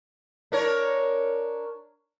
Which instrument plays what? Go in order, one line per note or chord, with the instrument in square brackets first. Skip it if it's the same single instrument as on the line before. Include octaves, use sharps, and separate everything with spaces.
[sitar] D4 A#4 C#5